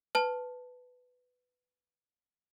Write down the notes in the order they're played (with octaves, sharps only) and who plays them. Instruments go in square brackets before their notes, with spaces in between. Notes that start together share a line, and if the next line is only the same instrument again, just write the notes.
[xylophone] B4 A5